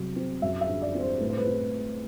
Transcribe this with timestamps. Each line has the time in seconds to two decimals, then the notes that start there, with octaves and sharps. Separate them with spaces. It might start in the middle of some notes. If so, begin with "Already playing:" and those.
Already playing: C3 F#3
0.16 C4
0.42 F#2 E5
0.61 E5
0.69 D3
0.82 D5
0.95 C4
1.01 C5
1.20 A2 B4
1.29 C5
1.37 B4
1.47 C4